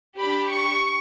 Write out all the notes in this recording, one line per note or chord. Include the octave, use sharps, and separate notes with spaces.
D4 G4 B5
C#6